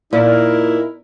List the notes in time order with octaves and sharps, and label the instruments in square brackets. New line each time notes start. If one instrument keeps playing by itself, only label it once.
[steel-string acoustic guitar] A#2 [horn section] D#4 E4 A#4